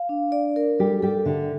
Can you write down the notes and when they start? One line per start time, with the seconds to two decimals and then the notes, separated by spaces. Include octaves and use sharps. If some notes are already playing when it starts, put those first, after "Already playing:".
Already playing: F5
0.09 D4
0.32 D5
0.56 A#4
0.79 G3 G4 A4
1.02 G3 G4 A4
1.25 D3 D4 E5